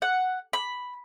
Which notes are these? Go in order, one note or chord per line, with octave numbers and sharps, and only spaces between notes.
F#5
B5